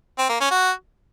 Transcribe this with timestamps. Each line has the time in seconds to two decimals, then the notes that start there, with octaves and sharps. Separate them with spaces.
0.18 C4
0.29 A#3
0.40 C#4
0.51 F#4